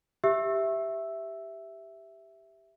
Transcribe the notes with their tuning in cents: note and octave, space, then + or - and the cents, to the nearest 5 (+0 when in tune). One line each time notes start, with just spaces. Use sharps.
G4 +0 E5 +0 E6 +0